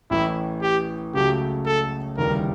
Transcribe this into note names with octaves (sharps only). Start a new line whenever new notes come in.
A1 A2 E3 E4
G4
C#2 C#3 F#3 A3 G4
A4
F1 D#2 C#3 E3 G3 A#4